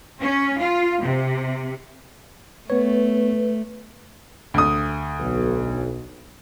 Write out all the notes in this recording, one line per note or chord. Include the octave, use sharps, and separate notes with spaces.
C#4
F4
C3
A3 B3 B4 C#5
D2 D#6
B1